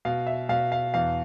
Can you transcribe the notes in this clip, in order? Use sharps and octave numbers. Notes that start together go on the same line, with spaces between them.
B2 F5
E5
B2 F5
F5
E2 F5